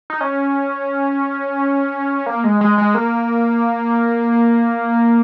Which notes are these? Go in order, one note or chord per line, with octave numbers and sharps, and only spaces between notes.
D#4
C#4
A#3
G#3
G#3
G#3
A#3